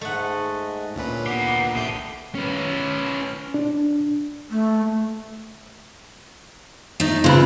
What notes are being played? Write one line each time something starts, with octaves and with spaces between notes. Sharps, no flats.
G#2 G#3 A3 D#5 F#5
D2 A#2 C#4 B4
A#3 B3 G4
A1 A3 G4 D#5 G6
C#4 B4
D4
A3
A3 D#4
C#3 C4 F4 B4 B5